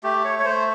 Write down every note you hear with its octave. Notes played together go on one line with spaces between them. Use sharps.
A3 G4
C#5
C#5
A3 C5